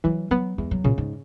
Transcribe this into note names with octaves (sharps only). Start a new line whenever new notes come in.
E3 F#3
F#3 B3
E2 G#3
F#3
A#2 C#3
G#2